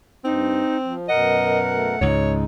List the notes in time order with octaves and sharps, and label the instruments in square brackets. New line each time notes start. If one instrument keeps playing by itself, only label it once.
[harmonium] G2 [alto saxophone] C4 [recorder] D#4
[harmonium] F3
[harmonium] F#2 B2 A#4 [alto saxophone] D#5 [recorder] F#5
[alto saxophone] A3
[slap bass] C#2 G#2 [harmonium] G#3 D#4 [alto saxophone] C#5